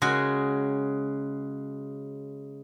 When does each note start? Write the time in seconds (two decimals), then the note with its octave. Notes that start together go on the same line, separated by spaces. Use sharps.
0.02 C#3 G#3 F#4